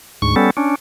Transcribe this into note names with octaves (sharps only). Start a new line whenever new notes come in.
D2 G#2 C#6
G3 B3 C#4 A4
C#4 D4